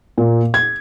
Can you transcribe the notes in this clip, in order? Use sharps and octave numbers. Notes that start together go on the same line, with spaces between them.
A#2
G#6